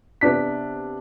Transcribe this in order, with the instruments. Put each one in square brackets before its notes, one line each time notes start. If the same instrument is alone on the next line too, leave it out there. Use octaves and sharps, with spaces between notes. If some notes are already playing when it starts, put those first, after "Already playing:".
[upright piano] C3 B3 D4 B6